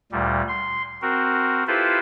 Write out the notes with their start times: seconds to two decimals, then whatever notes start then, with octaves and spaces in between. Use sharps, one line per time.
0.12 D2 A#2 G3
0.48 C6
1.02 C4 F#4 A#4
1.67 E4 F4 G4 A4 B4 C5